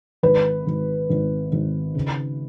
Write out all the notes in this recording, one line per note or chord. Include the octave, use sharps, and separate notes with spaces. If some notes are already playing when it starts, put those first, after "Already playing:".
G#1 B4
G#1
G#1
G#1
C#3